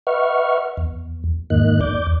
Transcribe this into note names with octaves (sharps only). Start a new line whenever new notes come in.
B4 D#5 E5 F#5 C#6 F6
E2
E2 G#2 D#3 A#3 D#5 F#6
E2 D5 D6 G6